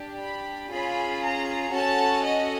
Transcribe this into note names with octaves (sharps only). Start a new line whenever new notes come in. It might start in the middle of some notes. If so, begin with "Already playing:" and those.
Already playing: D4 G4
B5
C#4 F4 G#4 B5
A#5
C#4 F#4 A4 A5
D#5